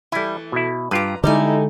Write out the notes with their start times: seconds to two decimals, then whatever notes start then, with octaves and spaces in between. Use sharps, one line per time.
0.12 E3 G3 A3 E4
0.52 B2 E4
0.91 G2 F4 G4 B4 A#5
1.24 D3 G3 G#3 D#4 E4 G4 A4 G#5